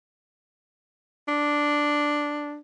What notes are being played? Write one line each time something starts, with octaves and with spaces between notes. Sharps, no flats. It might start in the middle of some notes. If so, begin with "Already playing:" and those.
D4